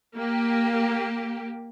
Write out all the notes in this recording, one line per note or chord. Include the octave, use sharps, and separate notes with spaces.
A#3 G4